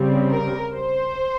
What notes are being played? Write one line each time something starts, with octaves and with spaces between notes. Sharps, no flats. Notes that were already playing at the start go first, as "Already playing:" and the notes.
Already playing: C#3 G3 C4
A#4
C5